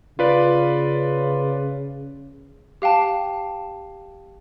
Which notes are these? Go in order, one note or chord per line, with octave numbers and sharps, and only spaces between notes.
C#3 F4 B4 D5
G4 F5 G5 A5